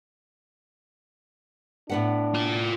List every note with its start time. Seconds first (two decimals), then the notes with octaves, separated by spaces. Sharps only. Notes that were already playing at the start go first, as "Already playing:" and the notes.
1.90 A2 B3 D4 F#5
2.34 F4 D5